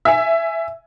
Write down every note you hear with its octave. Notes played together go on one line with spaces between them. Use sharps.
E5 G#5